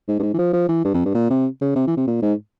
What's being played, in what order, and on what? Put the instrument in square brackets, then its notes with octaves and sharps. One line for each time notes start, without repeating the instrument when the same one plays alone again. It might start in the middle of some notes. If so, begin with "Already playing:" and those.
[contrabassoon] G#2
G2
G#2
E3
F3
F3
E3
G2
F2
G2
A#2
C3
C#3
C3
E3
C3
A#2
G#2